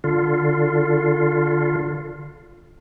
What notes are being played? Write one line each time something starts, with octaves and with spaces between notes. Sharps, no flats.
D3 F4